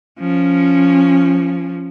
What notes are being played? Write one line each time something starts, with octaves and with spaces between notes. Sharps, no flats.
F3 C#4